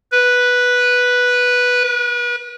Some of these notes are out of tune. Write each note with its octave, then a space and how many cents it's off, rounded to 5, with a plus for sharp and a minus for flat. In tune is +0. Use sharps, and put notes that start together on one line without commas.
B4 -5
B4 -35